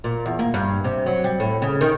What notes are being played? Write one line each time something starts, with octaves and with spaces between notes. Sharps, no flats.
A#2
E2
A#3
G2
C3
F#3
G3
A2
C#3
D#3